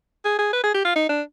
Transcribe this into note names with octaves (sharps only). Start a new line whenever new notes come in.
G#4
G#4
B4
G#4
G4
F4
D#4
D4